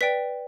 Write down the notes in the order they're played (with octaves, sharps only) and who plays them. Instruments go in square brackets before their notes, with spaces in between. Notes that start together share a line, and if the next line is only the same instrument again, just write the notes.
[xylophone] B4 D5 G5 B6